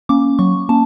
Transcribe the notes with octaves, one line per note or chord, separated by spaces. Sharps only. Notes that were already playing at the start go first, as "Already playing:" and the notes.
A#3 C#4 D6
F#3 C#6
A#3 C#4 A5